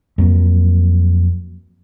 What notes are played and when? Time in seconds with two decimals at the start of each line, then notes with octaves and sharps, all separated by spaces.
0.18 F2 F#3 A#3